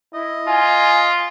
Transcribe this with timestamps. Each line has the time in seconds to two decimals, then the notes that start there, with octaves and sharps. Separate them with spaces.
0.14 E4 D#5
0.47 F4 G#5